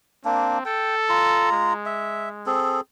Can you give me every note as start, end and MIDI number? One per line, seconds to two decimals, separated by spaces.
0.25 0.58 58
0.25 0.64 60
0.25 0.58 62
0.65 1.48 69
0.65 0.95 79
1.09 1.73 65
1.09 1.73 82
1.52 2.55 56
1.86 2.29 76
2.46 2.81 60
2.46 2.81 68
2.46 2.81 69